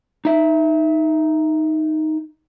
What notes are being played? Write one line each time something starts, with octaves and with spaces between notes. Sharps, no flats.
D#4 E5